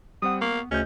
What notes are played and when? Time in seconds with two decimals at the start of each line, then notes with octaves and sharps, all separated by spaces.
0.22 G3 C4 F#5 D#6
0.41 A#3 B3 C#6
0.71 D2 C#3 C#4 D#5 G6